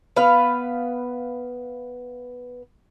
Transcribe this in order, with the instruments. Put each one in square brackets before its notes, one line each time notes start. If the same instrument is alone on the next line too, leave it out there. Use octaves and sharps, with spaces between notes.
[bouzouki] B3 B4 F5